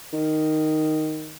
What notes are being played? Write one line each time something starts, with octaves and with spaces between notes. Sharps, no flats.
D#3